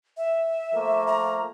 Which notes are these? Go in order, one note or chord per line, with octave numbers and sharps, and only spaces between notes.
E5
F3 A3 A#3
A#5